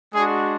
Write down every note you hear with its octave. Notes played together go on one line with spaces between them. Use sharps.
G#3 D4 F#4 G#4